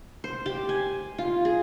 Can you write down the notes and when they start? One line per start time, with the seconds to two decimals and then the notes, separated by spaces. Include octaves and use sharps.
0.24 C5
0.46 G4
0.69 G#5
1.18 F4
1.45 G#4